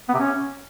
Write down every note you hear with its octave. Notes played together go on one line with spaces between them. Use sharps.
B3
C3
C#4